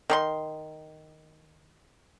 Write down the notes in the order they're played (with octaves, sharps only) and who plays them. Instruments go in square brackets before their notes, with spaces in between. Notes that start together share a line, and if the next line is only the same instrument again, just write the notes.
[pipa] D#3 G#4 C6